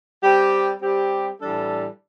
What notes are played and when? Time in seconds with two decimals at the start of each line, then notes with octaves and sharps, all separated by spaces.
0.23 G3 C4 G4
0.82 G3 C4 G4
1.40 A2 E3 G3 D4 A4